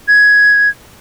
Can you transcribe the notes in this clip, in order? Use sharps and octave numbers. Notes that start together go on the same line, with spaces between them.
G#6